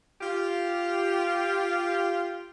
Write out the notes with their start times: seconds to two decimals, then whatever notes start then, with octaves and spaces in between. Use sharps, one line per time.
0.21 F4 G4